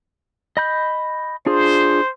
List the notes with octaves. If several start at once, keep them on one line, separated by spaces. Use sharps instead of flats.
D#5 B5 G6
D4 F4 G#4 C5